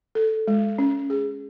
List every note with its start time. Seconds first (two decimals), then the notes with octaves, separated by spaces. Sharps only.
0.15 A4
0.48 G#3
0.78 C#4
1.10 G#4